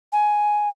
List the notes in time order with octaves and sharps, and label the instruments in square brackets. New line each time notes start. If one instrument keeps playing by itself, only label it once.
[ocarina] G#5